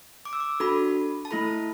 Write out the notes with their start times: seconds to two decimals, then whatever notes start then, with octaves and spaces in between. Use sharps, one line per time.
0.25 D6
0.33 E6
0.40 D6
0.60 D4 F#4 A4 B5
1.25 A5
1.31 A3 E4 A4 B5